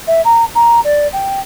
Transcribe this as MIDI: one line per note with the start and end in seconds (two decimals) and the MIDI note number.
0.07 0.21 76
0.25 0.44 82
0.55 0.80 82
0.84 1.07 74
1.13 1.40 79